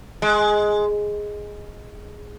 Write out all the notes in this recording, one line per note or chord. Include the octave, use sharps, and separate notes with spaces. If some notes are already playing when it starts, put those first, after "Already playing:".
G#3